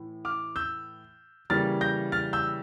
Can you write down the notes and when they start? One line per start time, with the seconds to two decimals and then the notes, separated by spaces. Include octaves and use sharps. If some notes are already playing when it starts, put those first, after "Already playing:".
Already playing: A2 E3
0.25 D6 F6
0.56 E6 G6
1.50 C#3 E3 G3 A#3 F6 A6
1.81 G6 A#6
2.12 F6 A6
2.33 E6 G6